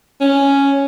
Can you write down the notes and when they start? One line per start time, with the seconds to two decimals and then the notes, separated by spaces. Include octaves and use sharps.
0.21 C#4